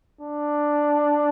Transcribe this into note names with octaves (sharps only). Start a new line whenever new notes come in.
D4